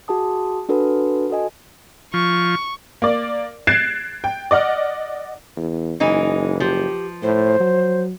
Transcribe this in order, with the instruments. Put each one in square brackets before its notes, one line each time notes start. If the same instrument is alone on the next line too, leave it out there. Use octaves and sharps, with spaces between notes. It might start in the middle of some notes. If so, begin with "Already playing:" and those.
[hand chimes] F#4 G#4 A5 D#6
D4 F#4 A4 B4
F#4 A4 D#5 G#5
[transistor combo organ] F3 [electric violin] C#6
[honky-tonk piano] A#3 D5
F#6 G#6 A6 C7 D7 E7
G5
D5 D#5 F#5 F6
[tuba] E2
[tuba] F#1 [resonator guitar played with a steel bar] E3 G#3 D#4
[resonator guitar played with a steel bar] F3 [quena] G4
[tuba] A2 [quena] C5
[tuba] F#3